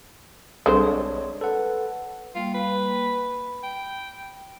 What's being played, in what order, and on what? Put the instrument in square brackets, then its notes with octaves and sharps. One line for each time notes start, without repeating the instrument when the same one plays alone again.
[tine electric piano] B1 G3 C4 [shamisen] D3 G#3 C5
[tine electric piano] C#5 D5
A4 B4 F#5
[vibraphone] G3 A#3 G5 [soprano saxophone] F4
[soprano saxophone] B4
[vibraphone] B5
[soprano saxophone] G5